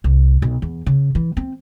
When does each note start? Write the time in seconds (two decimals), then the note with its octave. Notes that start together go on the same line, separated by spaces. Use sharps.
0.04 C2
0.42 B1
0.62 E2
0.86 C#3
1.15 E3
1.37 C4